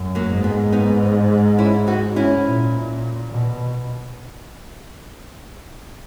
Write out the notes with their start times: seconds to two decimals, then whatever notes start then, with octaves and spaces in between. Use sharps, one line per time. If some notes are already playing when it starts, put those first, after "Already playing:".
Already playing: F#2
0.15 F#3 A#3
0.29 G#2
0.44 G#3 B3
0.72 B3 D#4
1.58 C#4 E4
1.87 D#4 F#4
2.16 C#4 E4
2.45 A#2
3.31 B2